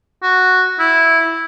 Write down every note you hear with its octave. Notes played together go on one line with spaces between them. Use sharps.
F#4
E4